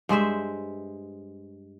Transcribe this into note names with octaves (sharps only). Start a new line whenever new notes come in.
G2 G#3 C5 E5